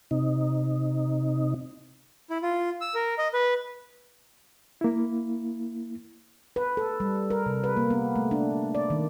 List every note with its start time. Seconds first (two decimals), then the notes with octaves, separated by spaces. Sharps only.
0.11 C3 D#4
2.30 E4
2.42 F4
2.81 E6
2.95 A#4
3.18 D#5
3.34 B4
4.81 A#3 E4
6.56 B4
6.77 A4
7.00 G3
7.30 A#4
7.46 C3
7.64 B4
7.77 A#3
7.91 B3
8.16 A3
8.31 D4
8.75 D5
8.90 D#3